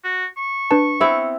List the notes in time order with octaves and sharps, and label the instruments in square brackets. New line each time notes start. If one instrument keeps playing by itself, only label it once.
[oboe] F#4
C#6
[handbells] D4 B4 A5
[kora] B3 C4 E4 [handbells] E5